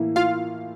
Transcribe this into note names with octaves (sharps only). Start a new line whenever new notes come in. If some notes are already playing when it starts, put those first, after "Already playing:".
Already playing: A2 E3 A#3 E4
F4 F5